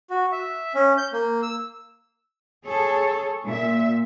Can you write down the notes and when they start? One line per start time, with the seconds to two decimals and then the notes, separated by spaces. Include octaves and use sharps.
0.10 F#4
0.32 E5
0.75 C#4
0.98 G6
1.13 A#3
1.42 E6
2.65 G#4 A4 C#5
3.45 A#2 E5